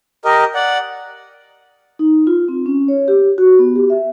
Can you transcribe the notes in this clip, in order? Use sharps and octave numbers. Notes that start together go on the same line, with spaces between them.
G4 A#4 D#5
D5 F#5
D#4
F4
C4
C#4
C#5
G4
F#4
B3
G4
E5